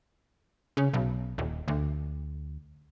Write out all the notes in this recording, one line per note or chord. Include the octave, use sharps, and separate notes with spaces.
C#3
B1
D#1
D2